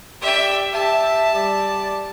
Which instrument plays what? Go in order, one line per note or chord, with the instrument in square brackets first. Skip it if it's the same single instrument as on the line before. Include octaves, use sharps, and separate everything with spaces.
[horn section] G4 D5 [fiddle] E5 G5
[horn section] G4 E5 [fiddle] A5
[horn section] G3 D5